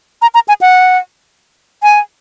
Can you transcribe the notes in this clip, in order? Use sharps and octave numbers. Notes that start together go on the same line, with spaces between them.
A#5
A#5
G#5
F#5
G#5